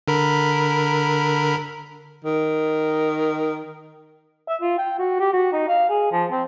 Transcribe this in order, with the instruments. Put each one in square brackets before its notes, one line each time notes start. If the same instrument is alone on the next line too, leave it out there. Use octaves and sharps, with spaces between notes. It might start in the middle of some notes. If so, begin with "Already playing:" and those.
[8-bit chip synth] D3 A#4 B5
[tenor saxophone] D#3
[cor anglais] E5
F4
G5
F#4
G4
F#4
D#4
F5
G#4
F3
C4